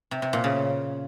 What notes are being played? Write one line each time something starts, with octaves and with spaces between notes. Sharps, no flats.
C3
C3
A#2
C#3